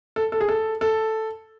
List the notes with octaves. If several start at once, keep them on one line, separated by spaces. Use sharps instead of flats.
A4
A4
G#4
A4
A4